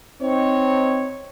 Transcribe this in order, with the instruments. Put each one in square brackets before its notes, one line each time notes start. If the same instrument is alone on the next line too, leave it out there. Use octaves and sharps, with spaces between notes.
[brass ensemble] C4 D#4 C#5